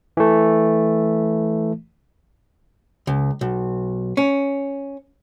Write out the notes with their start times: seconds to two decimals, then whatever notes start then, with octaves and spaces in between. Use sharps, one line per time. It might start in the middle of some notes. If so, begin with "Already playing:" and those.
0.17 E3 A3
3.07 C#2
3.41 B1
4.17 C#4